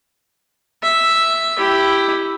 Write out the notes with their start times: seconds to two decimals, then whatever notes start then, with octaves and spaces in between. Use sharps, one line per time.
0.83 E5
1.58 E4 G4